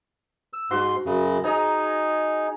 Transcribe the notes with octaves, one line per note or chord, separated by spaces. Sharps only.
E6
G#2 F#4 C6
F#2 C#3
D#4 G#4 D#5 A#5